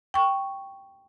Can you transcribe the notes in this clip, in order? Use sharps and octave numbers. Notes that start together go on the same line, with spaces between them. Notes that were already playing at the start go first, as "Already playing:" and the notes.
G5 C#6